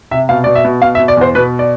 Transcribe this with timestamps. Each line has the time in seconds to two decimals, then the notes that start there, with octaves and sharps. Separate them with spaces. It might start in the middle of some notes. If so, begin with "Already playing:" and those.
0.11 C3 E5
0.29 B2 F5
0.44 B2 D5
0.55 E5
0.64 B2
0.82 B2 F5
0.95 E5
0.99 B2
1.08 D5
1.17 E2 C5
1.35 B2 B4
1.59 D5